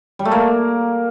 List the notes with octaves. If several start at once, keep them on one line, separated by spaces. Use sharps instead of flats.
G3
A3
A#3